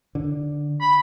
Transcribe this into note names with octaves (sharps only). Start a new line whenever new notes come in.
D3
B5